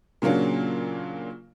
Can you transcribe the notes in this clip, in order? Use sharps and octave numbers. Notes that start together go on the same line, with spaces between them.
A#2 C#3 F#3 A#3 D4